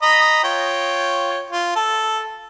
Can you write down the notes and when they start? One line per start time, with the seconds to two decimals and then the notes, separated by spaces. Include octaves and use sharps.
0.02 D#5 A#5 B5
0.44 F4 C#5 G5
1.50 F4
1.76 A4